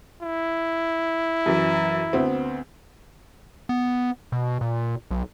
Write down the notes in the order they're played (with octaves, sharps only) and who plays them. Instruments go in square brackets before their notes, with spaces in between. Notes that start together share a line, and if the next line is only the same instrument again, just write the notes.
[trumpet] E4
[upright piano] F#2 E3
D2 B3 C4
[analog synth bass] B3
B2
A#2
B1